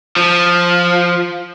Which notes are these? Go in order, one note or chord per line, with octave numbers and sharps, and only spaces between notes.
F3